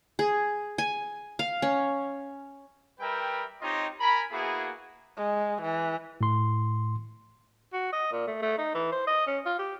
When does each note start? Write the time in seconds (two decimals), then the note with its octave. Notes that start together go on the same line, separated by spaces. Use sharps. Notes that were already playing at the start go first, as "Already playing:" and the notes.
0.19 G#4
0.78 G#5
1.39 F5
1.62 C#4
3.00 G3 A#4 B4 E5 G5
3.62 C4 D#4 F4 G4 C#5 D#5
4.00 A#4 G#5 A#5 B5
4.32 A#3 B3 E4 F#4 G#4
5.17 G#3
5.62 E3
6.21 A2 C6
7.73 F#4
7.93 D#5
8.12 A#2
8.27 A3
8.42 A3
8.58 D#4
8.75 E3
8.92 C5
9.07 D#5
9.27 C#4
9.46 F4
9.59 G4